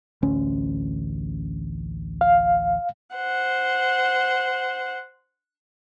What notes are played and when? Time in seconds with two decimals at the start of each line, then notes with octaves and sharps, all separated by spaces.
0.23 A1 D2 C#4
2.21 F5
3.16 C5 F#5